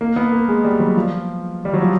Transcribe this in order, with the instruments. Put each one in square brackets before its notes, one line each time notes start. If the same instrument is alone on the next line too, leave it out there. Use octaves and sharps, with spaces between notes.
[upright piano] A#3
B3
A#3
G#3
G3
F#3
F3
G3
F#3
F3